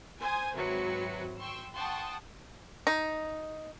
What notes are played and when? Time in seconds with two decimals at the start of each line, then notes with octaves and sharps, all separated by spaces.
0.19 C5 G#5 D#6
0.54 G#1 C3 F#3 B4 C#7
1.38 G5 C6 C#6 E6
1.75 F#5 G5 A5 C6 C#6 D#6
2.87 D#4